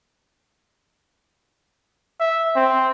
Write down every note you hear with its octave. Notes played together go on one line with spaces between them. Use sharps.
E5
C4